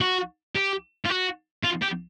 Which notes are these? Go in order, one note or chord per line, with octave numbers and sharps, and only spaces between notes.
F#4
G4
F4
F#4
F4
G4